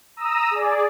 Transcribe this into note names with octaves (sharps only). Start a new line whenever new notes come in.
A#5 D#6 E6
G#4 D5